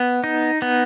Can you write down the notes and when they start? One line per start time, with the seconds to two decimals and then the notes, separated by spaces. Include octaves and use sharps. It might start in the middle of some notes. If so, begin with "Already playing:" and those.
Already playing: B3
0.24 D#4
0.62 B3